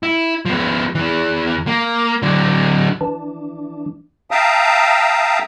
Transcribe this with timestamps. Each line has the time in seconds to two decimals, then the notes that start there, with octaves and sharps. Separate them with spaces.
0.03 E4
0.45 F3 B3
0.95 E2 E3
1.67 A#3
2.22 D3 F#3
3.01 E3 D4
4.31 E5 F5 G5 A5 A#5 D#6